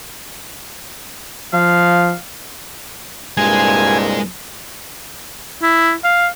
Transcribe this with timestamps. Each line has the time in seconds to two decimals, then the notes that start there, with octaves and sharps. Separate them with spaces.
1.53 F3 F5
3.37 C2 G2 A#2 G#3 G#5
5.62 E4
6.04 F5